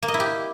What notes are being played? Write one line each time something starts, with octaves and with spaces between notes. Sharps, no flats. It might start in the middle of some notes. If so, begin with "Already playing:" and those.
A#3
D#5
E4
G4